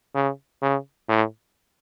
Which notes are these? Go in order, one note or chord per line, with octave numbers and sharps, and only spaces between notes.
C#3
C#3
A2